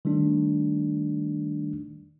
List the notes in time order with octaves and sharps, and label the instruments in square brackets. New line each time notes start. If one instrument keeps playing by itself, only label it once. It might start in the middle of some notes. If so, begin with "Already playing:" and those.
[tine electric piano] D#3 G3 A3 D4 D#4